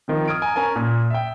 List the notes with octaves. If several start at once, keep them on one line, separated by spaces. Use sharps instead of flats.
D#3 F3 C4
D#6 F6 G#6 D7
G#5 A#5
C#4 A#4 G#5 A5
A#2
E5 G5